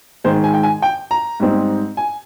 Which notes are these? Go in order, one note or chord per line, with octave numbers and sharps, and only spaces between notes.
G#2 D#3 G#3 C5
G#5
G5
G#5
G5
A#5
G#2 G3 C4 D#4
G#5